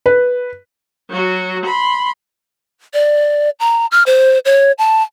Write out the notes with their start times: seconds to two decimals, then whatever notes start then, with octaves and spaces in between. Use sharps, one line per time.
0.06 B4
1.10 F#3 F#4
1.66 B5 C6
2.94 D5
3.60 A#5
3.91 F6
4.06 C5
4.45 C#5
4.78 A5